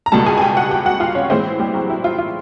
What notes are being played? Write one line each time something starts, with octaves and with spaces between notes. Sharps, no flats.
A#5
C#2 B2 G3 A4 A5
G#4 G#5
G#5
G4 G5
F#4 F#5
G4 G5
F#4 F#5
F4 F5
C#4 C#5
A2 E3 G#3 C4 C5
G3 G4
F#3 F#4
E4
F4
F4